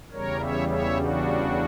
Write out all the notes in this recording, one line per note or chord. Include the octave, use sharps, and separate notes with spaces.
E2 C#3 G3 A#4 C#5
C#5 E5
C#5 E5
D4 F#4